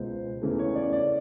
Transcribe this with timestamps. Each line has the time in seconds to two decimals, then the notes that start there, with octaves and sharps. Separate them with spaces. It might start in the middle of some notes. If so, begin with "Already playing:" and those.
Already playing: C#2 B2 G#3 C5
0.42 E2 C#3 E3 A3
0.59 C#5
0.75 D5
0.92 D5